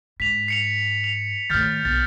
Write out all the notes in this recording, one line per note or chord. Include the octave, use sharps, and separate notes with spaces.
G#2 B6 F7
C7 C#7 F7
F7
A2 D#3 F6 G6 A6
B1 A6